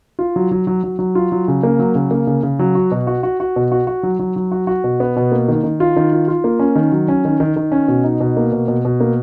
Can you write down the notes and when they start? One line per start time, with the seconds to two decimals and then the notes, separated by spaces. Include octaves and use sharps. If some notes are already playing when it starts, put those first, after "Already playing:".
0.19 F4
0.36 F#3
0.51 F#3
0.67 F#3
0.84 F#3
0.99 F#3
1.15 F4
1.32 F#3
1.48 C#3
1.63 A#3
1.79 F#3
1.95 C#3
2.11 A#3
2.27 C#3
2.43 C#3
2.59 F#3
2.75 F#4
2.92 B2
3.07 F#4
3.23 F#4
3.40 F#4
3.56 B2
3.72 F#4
3.87 F#4
4.03 F#3
4.19 F#3
4.36 F#3
4.52 F#4
4.67 F#4
4.84 B2
5.00 B3
5.16 B2
5.32 A#3
5.48 D#3
5.63 D#3
5.80 F4
5.96 D#3
6.13 F4
6.28 F4
6.44 A#3
6.59 C#4
6.75 D#3
6.92 F#3
7.08 C#4
7.25 D#3
7.40 D#3
7.56 D#3
7.72 C#4
7.88 B2
8.04 D#4
8.21 B2
8.37 A#3
8.52 B2
8.68 B2
8.85 B2
9.00 A#3